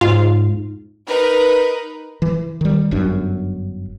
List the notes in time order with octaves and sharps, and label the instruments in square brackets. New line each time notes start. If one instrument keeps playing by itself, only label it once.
[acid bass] G#2 [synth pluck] F4
[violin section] D#4 A#4 B4
[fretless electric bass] E3
D#3 G3
G1 F#2 D4